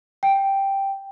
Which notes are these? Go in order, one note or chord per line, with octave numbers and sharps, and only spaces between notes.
G5